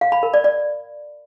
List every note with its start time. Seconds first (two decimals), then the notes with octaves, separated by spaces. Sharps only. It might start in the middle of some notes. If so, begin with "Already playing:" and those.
0.01 F5
0.12 B5
0.23 A#4
0.34 D5
0.44 D5